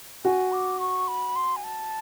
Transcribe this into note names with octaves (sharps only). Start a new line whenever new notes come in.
F#4 G#5
D6
C#6
B5
C6
G#5
A5